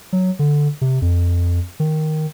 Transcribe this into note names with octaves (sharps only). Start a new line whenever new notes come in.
F#3
D3
C3
F2
D#3